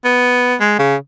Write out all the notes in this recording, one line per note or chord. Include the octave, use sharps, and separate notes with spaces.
B3
G#3
C#3